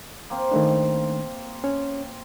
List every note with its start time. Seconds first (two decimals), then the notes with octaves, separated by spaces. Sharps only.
0.30 A#3 C4 F5
0.51 D#3 A3 D4
1.64 C#4 C#5